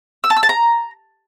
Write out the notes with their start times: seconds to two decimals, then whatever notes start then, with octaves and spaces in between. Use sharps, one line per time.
0.24 E6
0.30 A5
0.36 E6
0.43 A5
0.49 A#5